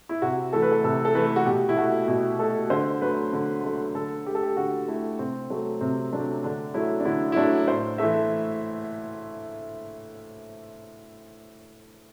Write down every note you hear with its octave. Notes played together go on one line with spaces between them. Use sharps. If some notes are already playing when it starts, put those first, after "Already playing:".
E4
C3 F#4
E3 A3 A4
B4
A4
C3 A4
A4
E3 A3 B4
F#4
B2 G4
E4
A3 F#4
B2 E4
A3 A4
D3 C5
F#3 A3 B4
D3
F#3 A3
D3 A4
A3 G4
A4
G4
D3 F#4
A3 E4
C3 C4
F#3 A3
C3 C4
F#3 A3 D4
D3 D4
F#3 A3 E4
D4
D3 E4
E4
F#3 A3 D4
A2 C5
E3 A3 E5